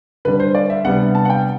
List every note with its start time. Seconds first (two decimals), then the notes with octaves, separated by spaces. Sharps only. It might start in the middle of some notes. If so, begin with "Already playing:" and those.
0.25 D3 G3 D4 B4
0.40 C5
0.55 D5
0.70 E5
0.84 C3 G3 B3 D4 F#5
1.15 A5
1.25 F#5
1.30 G5